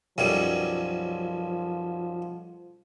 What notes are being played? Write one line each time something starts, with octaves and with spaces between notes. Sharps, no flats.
B1 F#2 F3 G3